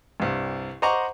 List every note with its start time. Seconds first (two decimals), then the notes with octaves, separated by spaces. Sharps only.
0.20 C2 G2
0.82 C5 D#5 F#5 A#5 C#6 D6